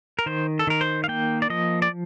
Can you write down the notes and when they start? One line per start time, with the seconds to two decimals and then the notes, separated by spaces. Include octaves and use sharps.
0.19 A#4
0.26 D#3 C5
0.59 A4
0.67 D#3 A#4
0.81 C5
1.04 F5
1.08 A#3 G5
1.42 D5
1.50 F3 D#5
1.82 D5